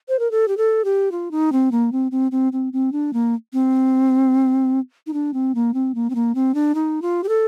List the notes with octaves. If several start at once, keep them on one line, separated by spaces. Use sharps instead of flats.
C5
A#4
A4
G4
A4
G4
F4
D#4
C4
A#3
C4
C4
C4
C4
C4
D4
A#3
C4
D#4
D4
C4
A#3
C4
A#3
C4
A#3
C4
D4
D#4
F4
G4
A4